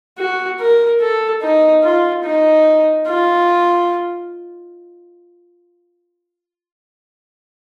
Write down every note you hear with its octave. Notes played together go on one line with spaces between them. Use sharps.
F#4
A#4
A4
D#4
F4
D#4
F4